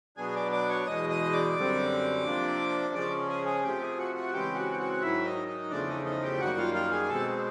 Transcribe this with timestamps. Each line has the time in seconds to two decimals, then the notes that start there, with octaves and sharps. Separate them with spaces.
0.17 B2 F#3 B3 D4 G#4 G#5
0.35 D5 D6
0.52 D5 D6
0.69 C#5 C#6
0.87 E2 B2 G#3 D#5 D#6
1.09 D#5 D#6
1.33 D5 D6
1.56 F#2 D3 G3 C4
2.25 C3 F3 A#3 D4
2.94 C#3 F3 G#3 C#4 D5 D6
3.29 G#4 G#5
3.45 G#4 G#5
3.64 C3 F3 A3 G4 G5
3.80 G#4 G#5
3.98 F#4 F#5
4.15 F#4 F#5
4.32 C#3 E3 G#3 C4 G4 G5
4.55 F#4 F#5
4.73 G5
4.79 F#4 F#5
5.01 G#2 D#3 F#3 E4 E5
5.25 D#4 D#5
5.48 D#4 D#5
5.70 E2 C#3 F3 A3 D4 D5
5.88 D#4 D#5
6.05 D#4 D#5
6.23 G4 G5
6.40 F#2 D#3 G3 A#3 F#4 F#5
6.58 F4 F5
6.74 F4 F5
6.91 G#4 G#5
7.09 B2 G#3 C4 A4 A5